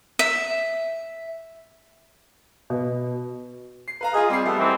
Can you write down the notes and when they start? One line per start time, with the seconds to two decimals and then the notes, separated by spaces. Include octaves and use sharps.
0.19 E5
2.70 B2
3.88 C7
4.01 B4 F5 A#5
4.14 F4 G#4 D#5
4.30 G3 C4 C7
4.45 G3 A3 B3 A4
4.59 D#3 E3 C4